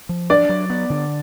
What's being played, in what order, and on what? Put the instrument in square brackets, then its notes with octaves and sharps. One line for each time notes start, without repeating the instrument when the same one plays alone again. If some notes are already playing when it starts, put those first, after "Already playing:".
[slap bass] F3
[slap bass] D4 [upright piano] D5
[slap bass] F#3
B3
D3